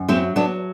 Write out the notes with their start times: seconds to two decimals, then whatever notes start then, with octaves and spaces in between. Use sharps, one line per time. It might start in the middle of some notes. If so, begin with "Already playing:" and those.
Already playing: F#2
0.08 F#3 C4 E4
0.36 F#3 B3 D4